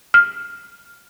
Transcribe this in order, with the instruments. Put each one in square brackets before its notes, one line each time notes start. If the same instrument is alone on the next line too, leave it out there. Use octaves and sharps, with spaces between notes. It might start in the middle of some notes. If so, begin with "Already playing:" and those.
[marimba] F6